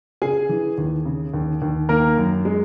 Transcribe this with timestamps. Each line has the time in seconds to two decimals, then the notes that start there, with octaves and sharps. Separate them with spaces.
0.22 C#3 G#4 G#5
0.49 E3
0.78 D#2
1.06 C#3
1.34 D#2
1.62 D#2
1.89 D#3 A#3 A#4
2.17 F#2
2.45 G#3